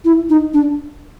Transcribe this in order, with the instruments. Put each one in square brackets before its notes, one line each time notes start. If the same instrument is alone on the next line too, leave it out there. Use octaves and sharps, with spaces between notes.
[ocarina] E4
D#4
D4